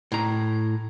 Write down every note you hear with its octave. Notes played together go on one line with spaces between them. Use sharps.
A2 A#5